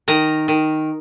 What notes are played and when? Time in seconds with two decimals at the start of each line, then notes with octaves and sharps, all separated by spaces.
0.08 D#3 A#5
0.48 D#3